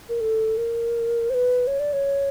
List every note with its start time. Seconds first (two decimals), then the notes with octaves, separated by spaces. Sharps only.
0.09 A#4
0.21 A4
0.57 A#4
1.30 C5
1.34 B4
1.67 C#5
1.80 D5
1.93 C#5